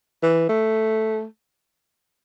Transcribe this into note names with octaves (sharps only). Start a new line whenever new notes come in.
E3
A3